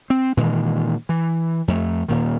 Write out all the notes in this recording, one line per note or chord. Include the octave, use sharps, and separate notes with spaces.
C4
A#2 D#3 E3 G#3
E3
F2 A3
D#1 A#2 D#3